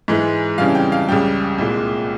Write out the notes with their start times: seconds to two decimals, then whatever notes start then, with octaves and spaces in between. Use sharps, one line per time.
0.08 G#2 E3 G#3
0.58 F2 C#3 E3 G3 F5
0.75 G5
0.92 F5
1.09 C#2 C#3 G3 G5
1.58 C2 A#2 G#3